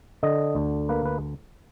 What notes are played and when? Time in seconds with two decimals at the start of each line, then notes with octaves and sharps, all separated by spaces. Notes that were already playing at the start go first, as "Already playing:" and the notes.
0.23 D3 D#5
0.55 D2
0.89 A#3 B4
1.05 B4